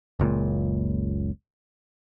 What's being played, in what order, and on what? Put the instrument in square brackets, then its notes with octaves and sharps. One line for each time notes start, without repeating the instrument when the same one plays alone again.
[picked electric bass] F#1 C#2 A#2